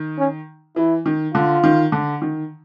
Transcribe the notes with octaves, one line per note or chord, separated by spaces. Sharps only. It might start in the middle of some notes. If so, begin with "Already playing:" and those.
Already playing: D#3
C#4
E3 E4
D#3
D3 F4
D#3
D3
D#3